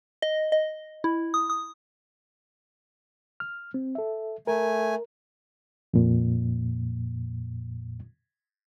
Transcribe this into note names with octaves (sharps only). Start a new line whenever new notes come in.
D#5
D#5
E4
D#6
D#6
F6
C4
A4 E5
A3 A#4 G#5
F2 A#2